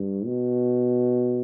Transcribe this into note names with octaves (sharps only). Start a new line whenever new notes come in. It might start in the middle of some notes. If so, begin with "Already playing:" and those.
Already playing: G2
B2